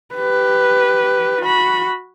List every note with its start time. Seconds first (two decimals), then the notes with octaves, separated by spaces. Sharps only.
0.15 G4 B4
1.41 F#4 B5